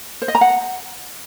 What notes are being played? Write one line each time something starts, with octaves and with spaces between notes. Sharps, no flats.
C5
D#5
A#5
F#5